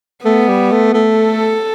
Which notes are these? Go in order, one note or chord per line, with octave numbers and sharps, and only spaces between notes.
A3 B3
G3
A3
A3
A4